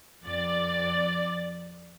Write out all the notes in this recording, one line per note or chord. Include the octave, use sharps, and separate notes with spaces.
F2 D5 A6